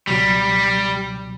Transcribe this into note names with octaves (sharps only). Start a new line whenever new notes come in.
C#2 B2 F#3 G3